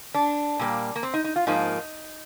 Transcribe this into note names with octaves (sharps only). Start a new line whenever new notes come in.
D4
A#2 G3 A#3
A#3
C4
D#4
D#4
F4
G#2 F3 A#3 D#4